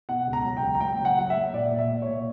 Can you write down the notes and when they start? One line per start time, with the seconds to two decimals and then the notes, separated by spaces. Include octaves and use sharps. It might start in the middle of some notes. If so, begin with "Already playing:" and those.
0.09 B2 F#5
0.27 C#2
0.33 A#5
0.44 F#3
0.57 G5
0.62 C#2
0.75 A#5
0.81 A#3 G5
1.00 F#3
1.05 F#5
1.18 F#3 F#5
1.30 E5
1.35 A#3
1.53 A#2 D5
1.71 A#2
1.78 E5
1.90 A#3
2.02 C#5
2.08 A#2